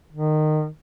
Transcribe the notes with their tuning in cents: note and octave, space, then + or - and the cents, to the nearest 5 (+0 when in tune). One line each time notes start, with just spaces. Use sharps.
D#3 -20